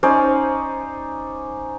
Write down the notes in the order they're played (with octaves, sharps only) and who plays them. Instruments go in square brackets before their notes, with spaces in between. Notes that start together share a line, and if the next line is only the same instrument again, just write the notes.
[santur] C#4 D#4 C5 D5